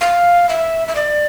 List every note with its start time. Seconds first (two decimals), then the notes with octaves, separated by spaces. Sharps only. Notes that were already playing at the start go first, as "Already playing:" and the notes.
0.01 F5
0.49 E5
0.88 E5
0.95 D5